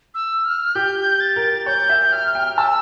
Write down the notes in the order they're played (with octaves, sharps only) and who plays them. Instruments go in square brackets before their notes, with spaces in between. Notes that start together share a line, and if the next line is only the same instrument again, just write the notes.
[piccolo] E6
F6
[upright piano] G4 [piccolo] G6
[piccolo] A6
[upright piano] A#4
[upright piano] C#5 [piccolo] G6
[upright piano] E5
[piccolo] F6
[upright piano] G5
[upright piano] A5 [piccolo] E6